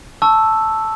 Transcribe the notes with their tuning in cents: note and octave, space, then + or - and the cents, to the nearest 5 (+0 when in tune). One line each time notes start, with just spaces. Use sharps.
A5 +0 C#6 +0 E6 +0